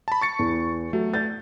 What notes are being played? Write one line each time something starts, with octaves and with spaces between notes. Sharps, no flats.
A5 B5
C#6 A6 C#7
E2
F#3 A3
G6 A6